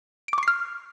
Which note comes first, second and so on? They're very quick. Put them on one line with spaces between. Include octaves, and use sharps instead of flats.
D7 D6 C#6 C7 F6